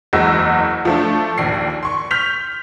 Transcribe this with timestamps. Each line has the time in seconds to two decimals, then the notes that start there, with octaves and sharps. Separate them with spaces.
0.13 F#1 E2 G#3 F#4 D#5 E6
0.85 F3 A3 D4
1.38 A#1 D#2 C7
1.83 C6 C#6
2.11 F6 G6 B6 F7